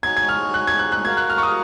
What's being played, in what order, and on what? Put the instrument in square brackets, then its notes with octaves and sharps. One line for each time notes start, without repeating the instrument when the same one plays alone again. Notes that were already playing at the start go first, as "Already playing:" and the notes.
[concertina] D#4 F#4 C#5 G#5 [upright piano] G#6
[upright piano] G#6
F6
F#6
G#6
F#6
F#6
[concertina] F#4 A#4 F5 [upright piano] G#6
[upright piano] F#6
F6
C#6
D#6